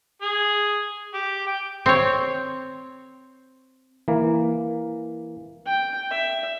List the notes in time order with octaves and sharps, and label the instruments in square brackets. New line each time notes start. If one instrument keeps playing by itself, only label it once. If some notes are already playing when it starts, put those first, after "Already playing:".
[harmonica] G#4
G4
G5
[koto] C4 C#5
[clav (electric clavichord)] E3 A#3
[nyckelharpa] G5
E5